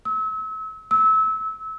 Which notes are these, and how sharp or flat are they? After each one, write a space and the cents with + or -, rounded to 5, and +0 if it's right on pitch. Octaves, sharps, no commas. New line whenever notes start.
E6 -35
E6 -25